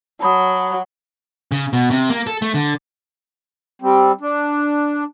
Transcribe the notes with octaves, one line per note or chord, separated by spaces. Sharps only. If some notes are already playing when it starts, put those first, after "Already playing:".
F#3 A5 B5 D#6
C#3
B2
C3
A#3
A4
A3
D3
G3 C4
D4